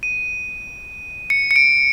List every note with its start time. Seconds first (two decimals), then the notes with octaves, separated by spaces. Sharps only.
0.03 D#7
1.30 C#7
1.51 C#7
1.56 D7